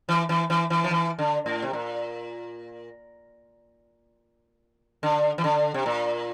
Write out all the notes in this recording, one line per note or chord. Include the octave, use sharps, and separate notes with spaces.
E3
E3
E3
E3
F3
E3
D3
A2
C3
A#2
D3
E3
D3
C3
A#2